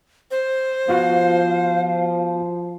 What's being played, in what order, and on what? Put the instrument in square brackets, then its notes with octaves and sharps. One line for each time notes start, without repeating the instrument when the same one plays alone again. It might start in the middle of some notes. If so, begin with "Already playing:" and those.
[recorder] C5
[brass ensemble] F3 [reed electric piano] B3 F4 F#4 [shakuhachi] F5